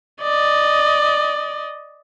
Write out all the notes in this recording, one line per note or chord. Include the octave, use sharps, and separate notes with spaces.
D5 D#5